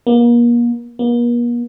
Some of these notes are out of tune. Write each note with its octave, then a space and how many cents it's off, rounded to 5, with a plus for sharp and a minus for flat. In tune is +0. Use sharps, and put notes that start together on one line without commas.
A#3 +35
A#3 +45